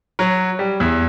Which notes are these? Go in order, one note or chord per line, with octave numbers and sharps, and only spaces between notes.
F#3
G3
E2